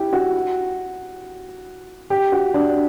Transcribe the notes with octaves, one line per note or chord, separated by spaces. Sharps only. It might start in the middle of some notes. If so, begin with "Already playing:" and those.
Already playing: E4 G4
F#4
G4
F#4
D4